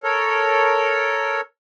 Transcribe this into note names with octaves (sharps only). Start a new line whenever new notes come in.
A4 A#4 C#5